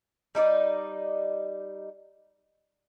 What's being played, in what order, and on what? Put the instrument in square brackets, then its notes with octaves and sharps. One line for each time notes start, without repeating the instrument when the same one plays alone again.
[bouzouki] G3 D#4 E4 D5